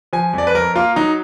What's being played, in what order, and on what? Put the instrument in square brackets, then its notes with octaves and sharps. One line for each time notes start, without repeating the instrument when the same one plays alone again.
[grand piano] F3 G#5
F2 D5
B4
F2 A#4
A#3 F4
F#3 D#4